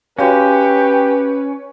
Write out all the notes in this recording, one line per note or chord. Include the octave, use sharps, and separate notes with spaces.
C#4 F#4 G4 B4 C#5 F5